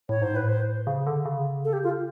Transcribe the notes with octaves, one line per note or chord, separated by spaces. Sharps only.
A2 C#5
G#2 C5
A2 B4
C5
C#3
D3
C#3
A4
G4
F4